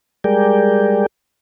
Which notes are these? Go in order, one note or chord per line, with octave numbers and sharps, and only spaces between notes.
G3 G#3 G#4 A#4 D5 G5